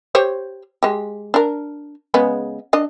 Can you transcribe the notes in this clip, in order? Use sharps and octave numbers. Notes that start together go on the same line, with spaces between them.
G4 C5 C#5
G#3 G4
D4 A#4
C#3 G#3 B3
D4 D#5